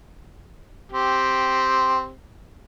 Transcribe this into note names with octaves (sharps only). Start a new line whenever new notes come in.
C4 G4